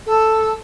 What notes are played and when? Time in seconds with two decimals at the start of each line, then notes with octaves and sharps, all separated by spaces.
0.06 A4